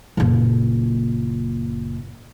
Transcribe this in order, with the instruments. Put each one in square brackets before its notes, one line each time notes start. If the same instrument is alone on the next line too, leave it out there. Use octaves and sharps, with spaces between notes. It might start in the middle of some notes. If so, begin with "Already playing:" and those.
[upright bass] F#1 A#2